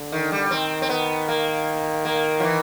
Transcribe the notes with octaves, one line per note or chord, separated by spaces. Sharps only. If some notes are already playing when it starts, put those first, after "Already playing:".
Already playing: D3
D#3
G3
D#3 C4
C4
B3
A#3
A#3
F3
E3